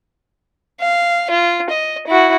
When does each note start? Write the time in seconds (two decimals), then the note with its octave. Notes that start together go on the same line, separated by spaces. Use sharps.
0.80 F5
1.31 F4
1.70 D#5
2.07 E4 F#4